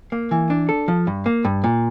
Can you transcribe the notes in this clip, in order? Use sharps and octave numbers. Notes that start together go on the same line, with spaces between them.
A#3
E3
D4
A4
F3
G2
A#3
G2
A#2